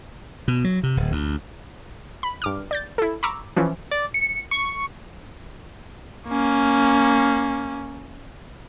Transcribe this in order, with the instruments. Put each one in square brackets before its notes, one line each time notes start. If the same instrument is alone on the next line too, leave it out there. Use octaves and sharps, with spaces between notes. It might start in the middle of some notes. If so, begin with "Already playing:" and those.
[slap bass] B2
F#3
C3
D1
D2
[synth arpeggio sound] B5
G2 D6 F6
D5 G6 A6
E4 A4
A#5 B5 C#6 D6 E6
E3 F3 C#4
[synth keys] D5
C#7
C#6
[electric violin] A#3 C#4